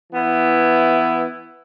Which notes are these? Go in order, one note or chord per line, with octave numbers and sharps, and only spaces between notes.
E3 B3 E4